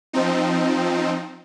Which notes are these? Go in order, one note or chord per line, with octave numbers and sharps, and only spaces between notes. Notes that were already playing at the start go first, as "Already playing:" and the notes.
F3 C4 D#4